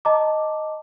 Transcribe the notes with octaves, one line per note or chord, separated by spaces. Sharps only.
D#5 A5 A#5 D6